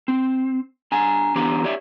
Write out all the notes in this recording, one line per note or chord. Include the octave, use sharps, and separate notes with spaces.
C4
D4 G#5 A#5
E3 B3 D4 G4 C5 A#5
G4 C#5 D5 E5